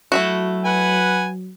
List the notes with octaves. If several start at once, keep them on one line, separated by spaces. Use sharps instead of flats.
F#3 A3 E4 F#4
B4 F#5 G#5